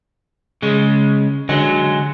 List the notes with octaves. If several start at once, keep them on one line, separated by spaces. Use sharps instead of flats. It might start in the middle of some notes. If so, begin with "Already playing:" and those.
C#3 G#3
D3 F#3 G#3